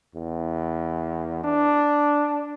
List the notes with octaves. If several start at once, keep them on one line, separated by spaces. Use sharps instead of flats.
E2
D4